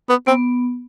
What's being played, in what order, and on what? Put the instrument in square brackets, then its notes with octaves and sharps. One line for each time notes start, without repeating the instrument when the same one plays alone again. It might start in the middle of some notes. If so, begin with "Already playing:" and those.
[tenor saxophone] B3
[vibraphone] B3 [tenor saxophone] C4